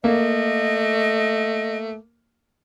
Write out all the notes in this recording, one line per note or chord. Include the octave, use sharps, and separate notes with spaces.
A3 A#3 D#5